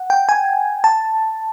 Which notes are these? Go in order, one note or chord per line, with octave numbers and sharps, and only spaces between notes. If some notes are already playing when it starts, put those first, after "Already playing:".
Already playing: F#5
G5
G#5
A5